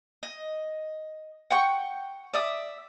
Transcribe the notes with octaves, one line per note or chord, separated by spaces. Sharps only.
D#5
F#5 G5 C#6
D5 E5 D#6